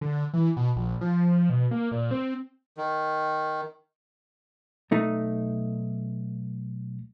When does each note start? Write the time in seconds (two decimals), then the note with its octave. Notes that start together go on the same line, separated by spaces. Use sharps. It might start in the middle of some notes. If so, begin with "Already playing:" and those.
0.01 D3
0.33 E3
0.57 B2
0.76 A#1
1.01 F3
1.50 B2
1.71 A#3
1.92 A#2
2.11 C4
2.77 D#3
4.91 B1 A3 D#4